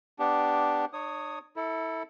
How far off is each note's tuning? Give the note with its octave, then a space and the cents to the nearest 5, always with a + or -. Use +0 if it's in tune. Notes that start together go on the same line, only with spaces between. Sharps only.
B3 +10 D4 +0 G4 +0
D4 +45 C#5 +0 D#6 +0
E4 -20 A4 +10